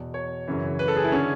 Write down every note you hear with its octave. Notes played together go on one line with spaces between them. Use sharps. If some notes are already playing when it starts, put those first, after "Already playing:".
Already playing: E2 B2
C#5
F#2 C#3 E3
B4
A4
G#4
E4
D3 C#4